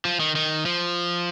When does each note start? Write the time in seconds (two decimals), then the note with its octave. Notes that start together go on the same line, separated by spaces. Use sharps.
0.05 F3
0.20 D#3
0.36 D#3
0.66 F3